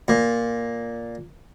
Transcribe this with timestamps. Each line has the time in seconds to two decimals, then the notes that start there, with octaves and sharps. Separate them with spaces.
0.08 A#2